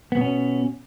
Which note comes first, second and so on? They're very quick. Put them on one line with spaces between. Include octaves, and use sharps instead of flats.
B3 B2 C#4